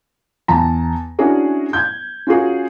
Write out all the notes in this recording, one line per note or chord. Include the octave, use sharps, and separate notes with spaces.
E2 A5 A#5
C#4 D4 E4 F#4 G#4 A#4
G6 G#6
C#4 F4 F#4 G#4 A#4